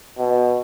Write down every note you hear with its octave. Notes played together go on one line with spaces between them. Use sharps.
B2